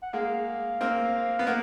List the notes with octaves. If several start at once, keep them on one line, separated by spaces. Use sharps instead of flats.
F#5
G#3 A#3 F5
A#3 C4
B3
A#3 F#5